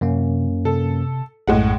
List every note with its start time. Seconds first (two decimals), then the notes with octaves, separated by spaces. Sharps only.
0.01 F#2 C3 A#3 C#4
0.65 C3 A4
1.47 A#1 F#2 A2 G#3 F#5